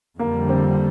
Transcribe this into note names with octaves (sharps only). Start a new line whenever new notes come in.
F2 D3 G3 A#3
C4